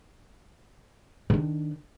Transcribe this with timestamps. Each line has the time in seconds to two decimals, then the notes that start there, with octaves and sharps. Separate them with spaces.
1.30 D#3 D4